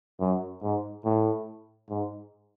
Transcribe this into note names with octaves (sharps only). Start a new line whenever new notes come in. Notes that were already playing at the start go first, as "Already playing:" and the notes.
F#2
G#2
A2
G#2